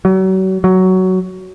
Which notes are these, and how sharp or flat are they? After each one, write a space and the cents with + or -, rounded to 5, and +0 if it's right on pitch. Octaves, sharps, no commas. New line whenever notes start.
F#3 +35
F#3 +10